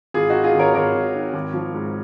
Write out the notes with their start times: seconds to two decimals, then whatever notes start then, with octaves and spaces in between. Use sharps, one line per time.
0.14 G#1 F4 G#4
0.30 D#3 D#4 F#4
0.44 F4 G#4
0.54 G#1
0.59 A#4 C#5
0.74 G#1 A#4 C#5
0.94 G#1
1.15 D#3
1.34 G#1
1.54 F3
1.74 G#2